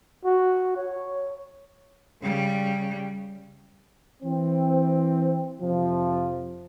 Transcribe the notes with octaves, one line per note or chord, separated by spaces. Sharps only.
F#4
C#5
C#3 G3
E3 C4
F2 C3 F3